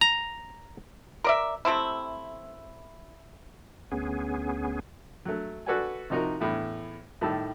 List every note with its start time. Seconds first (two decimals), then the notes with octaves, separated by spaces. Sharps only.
0.01 A#5
1.24 A#4 D5 E5
1.65 C3 A3 C4 E4
3.92 D2 B3 C#4 G#4
5.25 F#3 A3
5.66 F#4 A4 B4 D5 F#5 G#5
6.10 C3 F3 D#4 F#4 A#4
6.40 E2 A2 B5
7.21 A2 D#3 G3 A5 E6